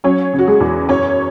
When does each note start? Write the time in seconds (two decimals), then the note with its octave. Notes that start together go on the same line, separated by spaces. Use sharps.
0.04 F#3 C#4 C#5
0.33 C#3
0.39 F#4
0.47 G#3 G#4
0.60 E2
0.89 F#2 C#4 C#5